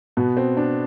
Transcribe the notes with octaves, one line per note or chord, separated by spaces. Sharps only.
B2 B3
C4
D4